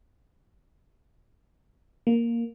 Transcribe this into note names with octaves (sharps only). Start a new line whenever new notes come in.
A#3